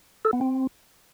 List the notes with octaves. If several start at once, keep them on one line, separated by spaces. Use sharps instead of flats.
A4
B3
C4